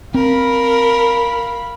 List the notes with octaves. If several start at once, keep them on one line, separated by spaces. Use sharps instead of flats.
C4 A#4 F5 B5